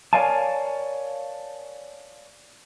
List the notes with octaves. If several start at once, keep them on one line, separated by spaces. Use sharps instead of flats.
A#4 C#5 D5 F5 G#5 A5